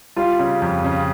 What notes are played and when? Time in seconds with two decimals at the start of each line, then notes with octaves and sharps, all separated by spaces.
0.16 G3 F4
0.39 C#3
0.62 F2
0.84 C#3